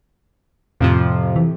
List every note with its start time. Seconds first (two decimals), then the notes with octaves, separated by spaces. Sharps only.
0.81 F2 A2 C3 F3
1.36 E3